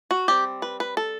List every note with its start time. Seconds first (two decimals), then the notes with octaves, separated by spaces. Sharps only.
0.11 F#4
0.28 G3 C4 G4
0.62 B4
0.80 B4
0.97 A4